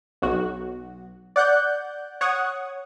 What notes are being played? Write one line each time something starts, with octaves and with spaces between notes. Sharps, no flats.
B1 F#4
D5 F#5 F#6 G6
C#5 F#5 C#6 D#6